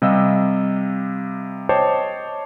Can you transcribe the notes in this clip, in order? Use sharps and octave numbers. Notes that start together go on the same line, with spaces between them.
C3 G3 D#5 F5 E6
C5 C#5 D#5 G5 A5 D6